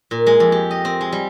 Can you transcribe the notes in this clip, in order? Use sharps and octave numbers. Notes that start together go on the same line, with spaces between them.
A#2
G#3
F2
G4
D#5
C4
G#3
G3